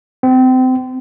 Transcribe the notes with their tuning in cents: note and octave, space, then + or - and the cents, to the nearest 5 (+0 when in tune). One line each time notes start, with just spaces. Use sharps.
C4 -30